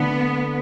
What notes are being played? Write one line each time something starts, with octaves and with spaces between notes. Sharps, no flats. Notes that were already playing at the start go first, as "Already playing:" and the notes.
Already playing: D3 A3 B3 D4